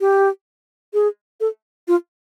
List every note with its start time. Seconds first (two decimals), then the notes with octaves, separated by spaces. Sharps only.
0.01 G4
0.94 G#4
1.40 A4
1.88 F4